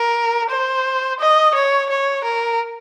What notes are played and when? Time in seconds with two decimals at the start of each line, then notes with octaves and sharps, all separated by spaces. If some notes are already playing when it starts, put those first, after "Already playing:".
Already playing: A#4
0.50 C5
1.20 D#5
1.55 C#5
1.90 C#5
2.25 A#4